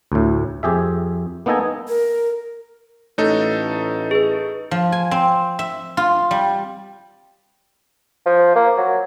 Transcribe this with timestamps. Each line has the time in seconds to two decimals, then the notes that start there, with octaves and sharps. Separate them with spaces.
0.12 D2 A2
0.63 F2 G4 G#4 E5
1.46 A#3 B3 D#4 A4 D#5 G#5
1.88 A#4
3.18 A1 A3 D#4 A4 C#5
4.11 G#4 B4
4.71 F3
4.92 G#5
5.11 C4
5.59 E5
5.97 F4
6.31 G3
8.26 F3
8.55 A#3
8.77 F#3